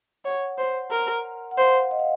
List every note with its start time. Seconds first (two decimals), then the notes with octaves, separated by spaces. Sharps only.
0.25 C#5 F#5
0.58 C5
0.91 A#4
1.51 F#5
1.58 C5 F5
1.91 D#5
1.99 F5